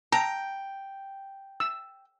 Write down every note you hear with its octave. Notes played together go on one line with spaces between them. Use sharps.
G5 A5 A#5
E6